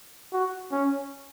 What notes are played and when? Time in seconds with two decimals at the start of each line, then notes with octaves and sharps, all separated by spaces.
0.33 F#4
0.72 C#4